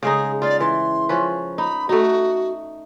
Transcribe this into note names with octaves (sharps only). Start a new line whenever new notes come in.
C#3 G#3 D#4 G#4
F4 D5 F5
E3 C6
F3 C#4 B4
D#4 B5
A3 D#4 F#4